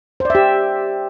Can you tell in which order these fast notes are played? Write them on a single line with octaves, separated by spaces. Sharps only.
C5 D5 E5 G4